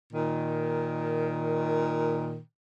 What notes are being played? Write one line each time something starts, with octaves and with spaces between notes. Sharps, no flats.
A#2 D#3